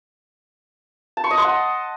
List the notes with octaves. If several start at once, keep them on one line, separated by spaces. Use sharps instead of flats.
A5
C#6
D#5
C6
F#5